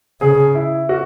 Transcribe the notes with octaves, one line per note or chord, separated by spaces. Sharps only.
C#3 G#4
E4
F#4